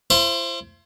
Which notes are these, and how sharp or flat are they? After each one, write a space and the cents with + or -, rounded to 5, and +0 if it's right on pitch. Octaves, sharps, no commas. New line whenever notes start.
E4 +45 C5 +10